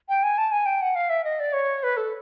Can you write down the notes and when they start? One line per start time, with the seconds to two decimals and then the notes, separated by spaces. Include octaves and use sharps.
0.09 G5
0.23 G#5
0.38 A5
0.52 G#5
0.66 G5
0.82 F#5
0.95 F5
1.10 E5
1.24 D#5
1.40 D5
1.53 C#5
1.83 B4
1.97 A4